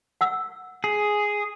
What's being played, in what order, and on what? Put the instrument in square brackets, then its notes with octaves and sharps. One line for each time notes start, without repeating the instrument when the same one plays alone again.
[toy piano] F#5 E6
[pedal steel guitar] G#4